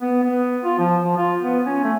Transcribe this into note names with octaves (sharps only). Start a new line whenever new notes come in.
B3
B3
F4
F3
F3
F4
B3
C#4
A3